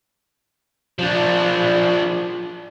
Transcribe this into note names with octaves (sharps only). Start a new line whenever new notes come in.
F3 D4